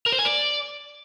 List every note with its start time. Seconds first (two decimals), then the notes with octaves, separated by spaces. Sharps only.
0.06 A#4
0.12 C5
0.19 G#5
0.25 D5